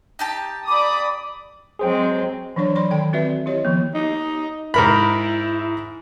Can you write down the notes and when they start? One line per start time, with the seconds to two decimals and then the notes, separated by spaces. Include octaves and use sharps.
0.19 D#4 G4 A5
0.67 D5 B5 D6 D#6
1.79 F#3 G#3 C4 G#4 C5 G5
2.56 E3 F#3 D4 C#5 D5
2.76 D5 B5 C6
2.91 D#3 A4 G5 A5
3.13 C4 F#4 B4 D5 E5
3.46 E4 G4 C#5 D#5
3.65 D#3 F3 B3
3.94 D#4
4.74 G#2 E4 A#4 B5